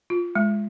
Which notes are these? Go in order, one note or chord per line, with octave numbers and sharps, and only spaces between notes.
F4
G#3